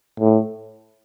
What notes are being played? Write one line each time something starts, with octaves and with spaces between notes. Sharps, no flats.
A2